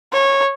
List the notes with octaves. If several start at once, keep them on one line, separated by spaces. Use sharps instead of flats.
C#5